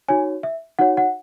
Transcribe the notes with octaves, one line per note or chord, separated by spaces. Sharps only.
D#4 F#4 C#5 G#5
E5
D#4 F#4 C#5 F#5
F#5